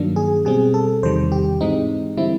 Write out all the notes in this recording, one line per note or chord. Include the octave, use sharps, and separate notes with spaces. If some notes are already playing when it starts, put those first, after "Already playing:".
Already playing: G2 D#3 F#3 A#3 D4
G#4
B2 G3 C4 G#4
A4
E2 C3 D#3 G3 C5
G4
G#2 E3 G#3 C4 D#4
D3 G3 C4 E4